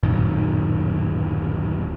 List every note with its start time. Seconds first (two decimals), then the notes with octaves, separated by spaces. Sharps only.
0.03 D1 F#2 A#2 D#3